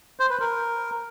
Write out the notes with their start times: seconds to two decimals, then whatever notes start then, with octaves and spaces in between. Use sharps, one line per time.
0.20 C5
0.30 B4
0.40 A#4